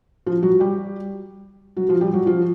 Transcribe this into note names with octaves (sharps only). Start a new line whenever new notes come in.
F3 F4
F#3 F#4
G3 G4
F#3 F#4
F3 F4
G3 G4
F#3 F#4
F3 F4